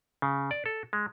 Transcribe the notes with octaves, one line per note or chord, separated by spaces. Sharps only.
C#3
D5
A4
G#3